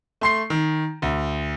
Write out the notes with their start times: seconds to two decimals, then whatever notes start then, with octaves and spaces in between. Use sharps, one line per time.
0.21 A3 C6 C7
0.50 D#3
1.02 D2